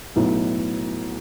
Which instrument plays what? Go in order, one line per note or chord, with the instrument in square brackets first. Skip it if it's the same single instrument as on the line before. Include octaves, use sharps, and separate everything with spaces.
[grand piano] B1 A2 F#3 B3 E4